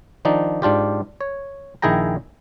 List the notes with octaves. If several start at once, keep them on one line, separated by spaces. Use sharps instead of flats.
D#3 F3 D4 D#4
G#2 D4 F4 G4
C#5
A#1 D#3 E4 G#4 G5 A#5